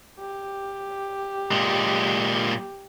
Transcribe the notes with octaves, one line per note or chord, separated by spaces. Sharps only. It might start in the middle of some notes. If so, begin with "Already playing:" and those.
G4
A#2 G#3